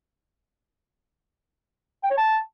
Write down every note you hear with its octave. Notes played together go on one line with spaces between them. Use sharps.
G5
C#5
A5